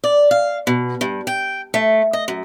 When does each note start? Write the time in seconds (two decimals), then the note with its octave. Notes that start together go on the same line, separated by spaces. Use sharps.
0.04 D5
0.31 F5
0.67 B2
1.01 G2
1.27 G5
1.74 A3
2.13 D#5
2.28 F#2